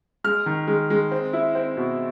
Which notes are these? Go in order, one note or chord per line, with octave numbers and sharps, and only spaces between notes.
G#3 F6
D#3
G#3
G#3
C4
E4
C4
B2